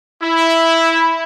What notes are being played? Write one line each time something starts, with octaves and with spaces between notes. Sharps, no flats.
E4